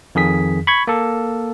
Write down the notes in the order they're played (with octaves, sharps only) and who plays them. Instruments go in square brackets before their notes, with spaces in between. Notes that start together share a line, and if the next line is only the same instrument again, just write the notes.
[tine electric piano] F2 D#3 G#4 B6
B5 C#6 G#6
A#3 A4